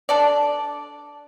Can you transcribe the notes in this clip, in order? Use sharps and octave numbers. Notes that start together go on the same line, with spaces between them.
D4 A4 D5